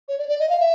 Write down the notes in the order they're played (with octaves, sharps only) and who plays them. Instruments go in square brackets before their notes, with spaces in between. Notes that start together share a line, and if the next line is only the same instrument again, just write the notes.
[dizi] C#5
D5
D5
D#5
F5
E5